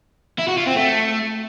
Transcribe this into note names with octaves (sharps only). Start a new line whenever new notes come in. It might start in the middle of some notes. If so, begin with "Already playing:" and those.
E4
F#4
F4
C4
A3